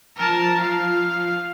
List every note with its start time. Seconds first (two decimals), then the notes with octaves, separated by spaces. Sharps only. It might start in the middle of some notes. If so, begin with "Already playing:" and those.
0.17 F3 A#4 A5
0.61 F5